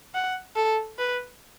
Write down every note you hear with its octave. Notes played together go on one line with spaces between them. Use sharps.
F#5
A4
B4